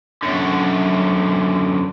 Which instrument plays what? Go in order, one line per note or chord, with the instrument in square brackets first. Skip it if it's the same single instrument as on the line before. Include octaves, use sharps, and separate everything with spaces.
[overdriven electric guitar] F#2 D3